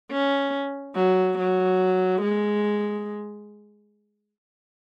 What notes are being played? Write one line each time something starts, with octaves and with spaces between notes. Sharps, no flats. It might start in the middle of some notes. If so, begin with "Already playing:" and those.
C#4
F#3
F#3
G#3